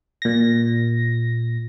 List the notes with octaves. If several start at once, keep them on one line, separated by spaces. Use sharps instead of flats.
A#2 A#6